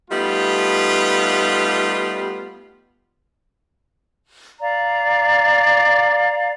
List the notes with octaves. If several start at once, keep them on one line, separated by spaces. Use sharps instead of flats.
G3 A3 B3 D#4 F4
D5 F5 A#5